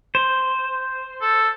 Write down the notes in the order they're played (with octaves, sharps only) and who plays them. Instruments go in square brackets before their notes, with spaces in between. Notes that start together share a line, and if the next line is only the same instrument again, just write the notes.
[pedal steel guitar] C5
[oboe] A4